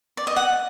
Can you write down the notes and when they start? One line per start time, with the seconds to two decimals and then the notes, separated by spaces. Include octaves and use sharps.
0.17 D5
0.27 D#5
0.36 F#5